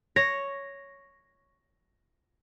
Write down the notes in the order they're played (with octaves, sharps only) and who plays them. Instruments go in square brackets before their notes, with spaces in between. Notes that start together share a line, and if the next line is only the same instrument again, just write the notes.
[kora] C#5 [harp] A#6